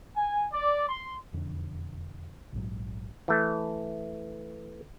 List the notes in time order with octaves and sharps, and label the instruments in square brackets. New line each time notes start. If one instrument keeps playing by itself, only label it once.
[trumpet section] G#5
D5
C6
[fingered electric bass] E1 F2 D3
A#1 G#2 F#3
[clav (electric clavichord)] E3 A3